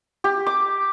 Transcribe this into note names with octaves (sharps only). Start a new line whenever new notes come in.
G4
D6